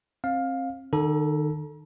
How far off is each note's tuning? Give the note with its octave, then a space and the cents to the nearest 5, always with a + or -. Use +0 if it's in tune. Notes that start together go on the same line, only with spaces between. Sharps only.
C4 +30 F5 +15
D#3 -35 A4 +0 A#5 +40